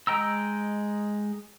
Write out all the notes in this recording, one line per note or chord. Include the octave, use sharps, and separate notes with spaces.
G#3 D#5 G5 A#5 E6